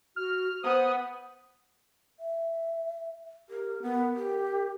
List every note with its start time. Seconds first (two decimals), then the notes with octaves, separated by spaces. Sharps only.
0.16 F#4 F6
0.63 B3 C5 D#6
2.20 E5
3.49 G4 A#4
3.82 B3 A#4
4.16 G4